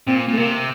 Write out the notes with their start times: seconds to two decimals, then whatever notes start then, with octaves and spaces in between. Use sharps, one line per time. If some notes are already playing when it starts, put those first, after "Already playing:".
0.07 A#2 C4
0.28 A#2 A3
0.37 C3 A#3